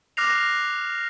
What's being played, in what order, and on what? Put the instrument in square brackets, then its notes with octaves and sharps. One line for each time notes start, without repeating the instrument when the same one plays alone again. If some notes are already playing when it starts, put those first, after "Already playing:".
[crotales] D6 F6 F#6 A#6 C7 F7